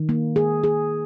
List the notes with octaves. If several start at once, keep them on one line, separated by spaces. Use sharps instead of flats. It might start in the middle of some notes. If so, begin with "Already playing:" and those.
Already playing: D#3
A#3
G#4
G#4